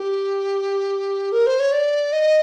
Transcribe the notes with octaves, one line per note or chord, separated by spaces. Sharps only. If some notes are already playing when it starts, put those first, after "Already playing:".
Already playing: G4
A#4
C5
C#5
D5
D#5